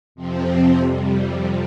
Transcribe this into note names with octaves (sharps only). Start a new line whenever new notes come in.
F2 C3 F3 C4
F2 C3 G3